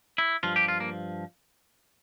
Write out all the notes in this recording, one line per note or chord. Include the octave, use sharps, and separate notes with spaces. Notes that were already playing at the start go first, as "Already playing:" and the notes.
E4
G2 F3 F4
G4
F4
A#3